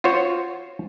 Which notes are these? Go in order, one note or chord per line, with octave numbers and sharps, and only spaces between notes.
F4 F#4 C5 C#5